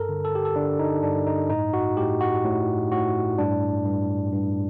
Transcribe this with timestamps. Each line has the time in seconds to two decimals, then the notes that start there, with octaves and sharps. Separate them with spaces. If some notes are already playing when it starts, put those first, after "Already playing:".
Already playing: G2 A4 A#4
0.09 D3
0.25 A4
0.35 G4
0.45 A4
0.56 D3 D4
0.79 D#4
1.03 G2 D4
1.27 D#4
1.50 A2 D#4
1.74 F#4
1.97 A2 G4
2.21 F#4
2.45 A2
2.91 A2 F#4
3.38 G2 D4
3.86 G2
4.33 G2